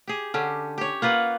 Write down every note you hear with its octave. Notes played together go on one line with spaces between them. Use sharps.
G4 G#4
D3 C#4 G4
G4 C#5
A#3 F4 B4 F#5